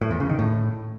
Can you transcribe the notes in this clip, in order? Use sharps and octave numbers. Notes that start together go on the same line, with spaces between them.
A2
E2
C#3
D#3
A2